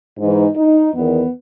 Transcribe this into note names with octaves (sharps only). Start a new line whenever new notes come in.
G#2 E3 D#4
D#4
E2 D#3 B3